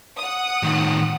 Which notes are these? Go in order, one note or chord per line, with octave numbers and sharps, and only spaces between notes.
F#5 D#6
A2 D#3